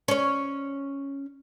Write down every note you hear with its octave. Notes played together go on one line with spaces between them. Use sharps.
C#4 C#5